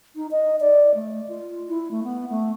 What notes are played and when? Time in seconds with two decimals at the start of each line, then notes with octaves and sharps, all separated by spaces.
0.16 D#4
0.31 D#5
0.60 D5
0.95 A3
1.29 F4
1.68 E4
1.91 A3
2.04 B3
2.30 A3